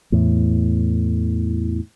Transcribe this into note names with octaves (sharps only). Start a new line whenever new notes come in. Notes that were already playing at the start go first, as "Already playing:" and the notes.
E2 A2